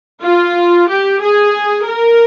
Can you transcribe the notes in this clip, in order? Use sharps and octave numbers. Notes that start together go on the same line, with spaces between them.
F4
G4
G#4
A#4